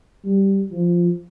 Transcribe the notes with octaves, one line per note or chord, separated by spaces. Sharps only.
G3
F3